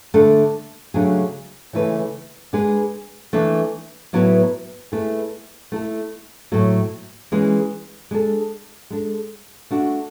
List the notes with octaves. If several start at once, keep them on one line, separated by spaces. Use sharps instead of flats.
D3 A3 D4 A4
C#3 F#3 A3 D4 G#4
C#3 E3 A3 E4 B4
G#3 D4 G#4 B4
E3 A3 D4
A2 F#3 B3 E4 B4
A3 E4 G#4 B4
A3 E4 A4
A2 F#3 A3
E3 G#3 C#4
G#3 D4 A4
G#3 D4 A4
A3 D4 F#4